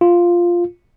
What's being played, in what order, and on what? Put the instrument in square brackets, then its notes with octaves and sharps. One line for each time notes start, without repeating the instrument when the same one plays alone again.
[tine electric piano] F4